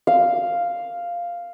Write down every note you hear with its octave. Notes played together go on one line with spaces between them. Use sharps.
F5